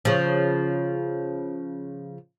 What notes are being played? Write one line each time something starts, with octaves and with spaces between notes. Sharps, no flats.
C#3 F3